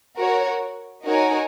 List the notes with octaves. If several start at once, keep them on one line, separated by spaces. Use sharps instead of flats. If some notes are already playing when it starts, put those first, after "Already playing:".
F#4 A#4 C#5
D#4 F#4 A#4 C#5 G#5